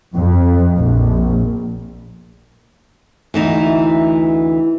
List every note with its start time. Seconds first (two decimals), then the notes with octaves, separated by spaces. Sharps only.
0.16 F2
0.79 A#1
3.34 D2 E3 D#4